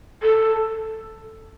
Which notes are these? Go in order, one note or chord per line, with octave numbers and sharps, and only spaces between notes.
A4